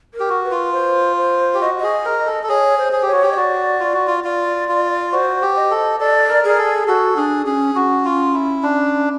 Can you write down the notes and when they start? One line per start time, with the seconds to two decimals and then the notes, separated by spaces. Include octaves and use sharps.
0.14 A#4
0.20 G4
0.29 F#4
0.44 B4
0.51 F4
0.73 C5
1.17 C5
1.54 G4
1.61 F#4 D#5
1.79 G#4 D#5
2.05 A#4
2.26 A4
2.43 A4
2.49 G#4 C#5
2.78 C5
2.93 G#4
3.02 G4 C#5
3.12 F#4
3.22 G4
3.32 D#5
3.36 F#4 D5
3.80 F4
3.93 F#4
4.07 F4
4.24 F4 D5
4.69 F4
5.12 F#4 C5
5.42 G4
5.56 D#5
5.71 A4
6.00 A4 D5
6.29 A#4
6.44 G#4 A#4
6.58 A4
6.87 F#4 A4
7.17 D4 G#4
7.46 C#4 G#4
7.75 C#4 F#4
8.05 F4
8.34 E4
8.63 D4